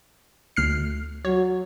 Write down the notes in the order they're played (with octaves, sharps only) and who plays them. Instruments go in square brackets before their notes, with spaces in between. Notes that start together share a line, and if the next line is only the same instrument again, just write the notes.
[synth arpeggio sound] D2 F6 C7
[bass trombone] F#3 [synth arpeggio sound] C#5